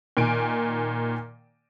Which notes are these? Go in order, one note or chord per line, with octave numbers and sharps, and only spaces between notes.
A#2 D#3 G#5 D7